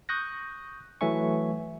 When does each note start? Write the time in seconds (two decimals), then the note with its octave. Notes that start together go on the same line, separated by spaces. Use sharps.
0.09 C#6 D#6 F#6 G6 A#6
1.01 E3 F#3 A3 E5 G#5 C#6